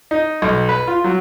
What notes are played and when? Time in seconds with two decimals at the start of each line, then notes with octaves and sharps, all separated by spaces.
0.11 D#4
0.42 B1
0.69 B4
0.87 F4
1.04 F#3